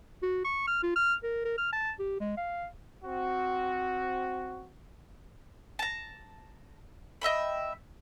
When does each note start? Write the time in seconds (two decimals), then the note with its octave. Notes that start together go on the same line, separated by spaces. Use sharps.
0.23 F#4
0.45 C#6
0.67 F6
0.83 F4
0.96 F6
1.23 A#4
1.45 A#4
1.58 F6
1.73 A5
1.99 G4
2.20 G#3
2.37 F5
3.03 C4 F#4
5.79 A5 A#5
7.22 D#5 E5 G5 B5